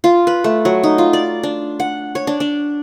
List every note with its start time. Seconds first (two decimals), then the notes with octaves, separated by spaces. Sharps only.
0.04 F4
0.27 B4
0.44 A3
0.65 F#3
0.84 D#4
0.98 F4
1.13 D5
1.43 D4
1.80 F#5
2.15 C#5
2.27 D4
2.40 D4